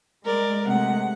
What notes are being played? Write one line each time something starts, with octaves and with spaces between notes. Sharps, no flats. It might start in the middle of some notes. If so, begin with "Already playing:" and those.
G#3 A#4 D5
C3 G#3 A3 F#5